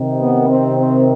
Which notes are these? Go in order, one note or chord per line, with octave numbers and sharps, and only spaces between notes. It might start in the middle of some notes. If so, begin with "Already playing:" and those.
Already playing: C3 D#3
B3
C4
C4